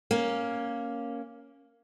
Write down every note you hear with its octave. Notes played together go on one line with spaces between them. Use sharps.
A#3 C#4